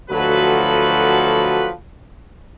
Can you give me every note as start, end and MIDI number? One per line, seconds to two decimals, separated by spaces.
0.10 1.70 38
0.10 1.70 53
0.10 1.70 54
0.10 1.70 66
0.10 1.70 69
0.10 1.70 71